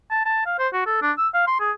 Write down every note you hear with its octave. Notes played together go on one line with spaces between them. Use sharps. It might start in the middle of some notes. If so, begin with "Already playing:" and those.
A5
A5
F5
C5
F#4
A4
D4
E6
F5
C6
G#4